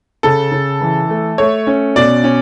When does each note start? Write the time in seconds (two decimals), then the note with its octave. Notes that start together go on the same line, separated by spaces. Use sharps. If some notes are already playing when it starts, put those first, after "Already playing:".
0.23 C#3 A4
0.52 C#3
0.81 E3
1.09 A3
1.38 A3 C#5
1.67 C#4
1.96 B2 D5
2.24 C#4